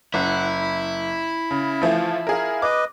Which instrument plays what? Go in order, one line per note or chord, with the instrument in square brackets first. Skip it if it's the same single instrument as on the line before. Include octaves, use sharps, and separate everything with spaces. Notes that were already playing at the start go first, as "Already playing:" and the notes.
[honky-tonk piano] F#1 [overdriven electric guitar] E4 [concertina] F#5
[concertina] B5
[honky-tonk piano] C#3
E3 F3 A3
F4 G#4 A#4
[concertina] B4 D#5 [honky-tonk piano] D6